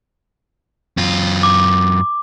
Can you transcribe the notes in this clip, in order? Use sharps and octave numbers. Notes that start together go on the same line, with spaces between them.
F#2 F4
D6